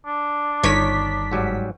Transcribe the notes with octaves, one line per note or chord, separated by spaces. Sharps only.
D4
G1 D#3 C#5 B6
G#2 F#3 G3